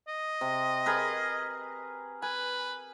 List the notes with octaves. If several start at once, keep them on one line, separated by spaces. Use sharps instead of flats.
D#5
C3
G#4 A#4 B4
B4 G#5